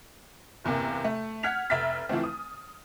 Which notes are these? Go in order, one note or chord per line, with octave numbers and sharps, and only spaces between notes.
G1 E2 C3 A#3
A3
F#5 F6 G#6 B6 F7
F1 E5 F6 A6 B6
E3 F3 A3 C4
D#6